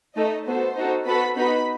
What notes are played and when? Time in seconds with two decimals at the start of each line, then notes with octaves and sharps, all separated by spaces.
0.16 A3 D#4 A4 D#5
0.46 B3 F#4 A4 C5
0.77 D#4 F#4 A4
1.06 B3 F#4 A4 B4 B5
1.37 B3 D#4 F#4 B4 B5